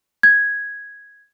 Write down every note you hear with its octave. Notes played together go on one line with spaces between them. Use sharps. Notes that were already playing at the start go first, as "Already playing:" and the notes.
G#6